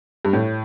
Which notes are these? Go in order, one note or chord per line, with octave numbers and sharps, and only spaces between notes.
G2
A2